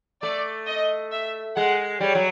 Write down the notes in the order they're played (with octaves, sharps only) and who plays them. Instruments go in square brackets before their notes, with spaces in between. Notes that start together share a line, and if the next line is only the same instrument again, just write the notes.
[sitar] A3 [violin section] D5
[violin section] D#5
E5
[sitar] G#3 [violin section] F#5
[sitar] G3 [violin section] C#5
[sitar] F#3